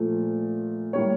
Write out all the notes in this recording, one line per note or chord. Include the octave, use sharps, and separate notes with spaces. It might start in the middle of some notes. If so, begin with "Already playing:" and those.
Already playing: A#2 F3 A3
A2 G3 A#3 C#5